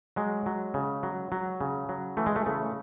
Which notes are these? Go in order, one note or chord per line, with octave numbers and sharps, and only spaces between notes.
F#3 G#3
F#3
C#3
F#3
F#3
C#3
F#3
E3 A3
G#3
A3
C#3 A3